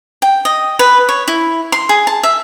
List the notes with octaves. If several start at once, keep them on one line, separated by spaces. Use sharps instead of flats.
G5
D#5
B4
C#5
E4
C6
G#4
A5
E5